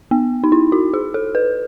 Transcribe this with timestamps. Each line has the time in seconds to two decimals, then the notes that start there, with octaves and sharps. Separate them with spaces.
0.11 B3
0.44 D#4
0.52 E4
0.72 F#4
0.94 G#4
1.14 A4
1.35 B4